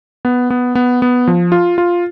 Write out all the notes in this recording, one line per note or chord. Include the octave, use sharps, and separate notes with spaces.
B3
B3
B3
B3
F3
F4
F4